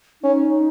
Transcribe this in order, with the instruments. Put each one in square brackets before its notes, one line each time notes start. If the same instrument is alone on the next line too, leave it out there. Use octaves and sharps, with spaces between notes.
[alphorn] C#4 [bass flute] D#4